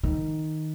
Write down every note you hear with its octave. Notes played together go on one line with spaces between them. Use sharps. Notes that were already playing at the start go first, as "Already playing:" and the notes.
D#3